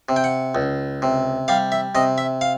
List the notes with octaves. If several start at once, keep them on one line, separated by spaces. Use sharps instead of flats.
C3
G5
F#5
C#2
C3
G3 F5
E5
C3 D#5
E5
F5